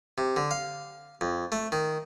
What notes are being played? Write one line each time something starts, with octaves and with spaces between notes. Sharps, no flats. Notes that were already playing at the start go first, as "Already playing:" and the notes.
C3
D3
F5
F2
A3
D#3